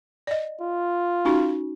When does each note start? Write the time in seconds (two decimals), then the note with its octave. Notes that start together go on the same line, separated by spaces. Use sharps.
0.27 D5 D#5
0.61 F4
1.25 C#4 D#4 F#4